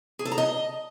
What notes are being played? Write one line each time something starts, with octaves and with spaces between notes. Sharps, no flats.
G#4
A4
A#5
D#5